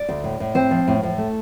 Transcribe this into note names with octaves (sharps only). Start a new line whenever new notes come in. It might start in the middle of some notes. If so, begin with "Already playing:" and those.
Already playing: D5
D2
A2
A2
C4 C5
F3
A2
A2
A3